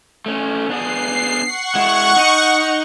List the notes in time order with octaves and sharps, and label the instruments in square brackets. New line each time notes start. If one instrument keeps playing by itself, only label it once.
[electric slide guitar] A3 C#4
[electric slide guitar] B3 D4 G#4 [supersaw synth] C7
[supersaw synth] F#5 C#6
[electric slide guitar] G#3 E4
D#4